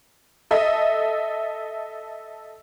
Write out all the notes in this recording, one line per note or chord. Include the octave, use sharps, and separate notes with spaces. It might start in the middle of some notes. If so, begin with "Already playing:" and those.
A4 D#5 E5